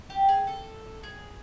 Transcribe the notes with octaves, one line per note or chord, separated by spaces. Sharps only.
G4
G#4
A4
G#4